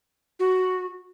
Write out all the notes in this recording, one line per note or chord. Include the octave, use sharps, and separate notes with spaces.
F#4